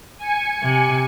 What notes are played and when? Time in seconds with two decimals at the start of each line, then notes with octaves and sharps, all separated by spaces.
0.18 G#5 C#7
0.62 C3